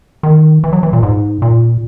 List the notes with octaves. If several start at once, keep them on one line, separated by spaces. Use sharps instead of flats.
D#3
E3
F#3
E3
A#2
G#2
A#2